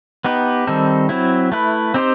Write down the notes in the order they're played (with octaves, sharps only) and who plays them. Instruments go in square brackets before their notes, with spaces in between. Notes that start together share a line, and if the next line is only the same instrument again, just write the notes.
[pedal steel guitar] B3 D#4 G4 B4
D#3 G3 C4 D#4 A4
F#3 C4 E4
A3 E4 B4
C4 D#4 G4 C5